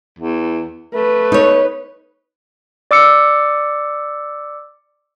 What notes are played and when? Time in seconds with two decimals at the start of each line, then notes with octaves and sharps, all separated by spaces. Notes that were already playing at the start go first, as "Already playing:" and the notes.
0.19 E2
0.94 A3 B4
1.32 D#4 C#5
2.91 D5 D6 E6 C#7